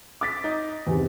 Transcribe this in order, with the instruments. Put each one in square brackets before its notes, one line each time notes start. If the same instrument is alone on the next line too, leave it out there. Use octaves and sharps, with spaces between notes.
[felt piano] D6 A6 B6
[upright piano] D#4
[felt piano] E2 C3